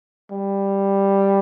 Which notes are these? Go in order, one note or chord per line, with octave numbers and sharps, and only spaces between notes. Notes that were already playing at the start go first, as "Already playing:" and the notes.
G3